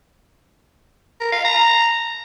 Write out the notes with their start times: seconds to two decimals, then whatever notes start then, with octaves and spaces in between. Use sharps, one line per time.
1.21 A#4
1.32 F5
1.44 A#5